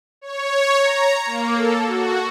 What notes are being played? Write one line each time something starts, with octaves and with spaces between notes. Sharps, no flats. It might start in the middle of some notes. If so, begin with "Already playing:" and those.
C#5
A#5
A#3
A4
F#4